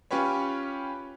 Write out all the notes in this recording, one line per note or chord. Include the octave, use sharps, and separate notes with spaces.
C#4 F4 G4 B4 C#5